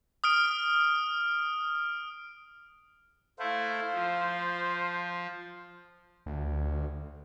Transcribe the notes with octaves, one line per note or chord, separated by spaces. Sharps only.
D#6 F6 D7
A3 E4 C5 F5
F3
D2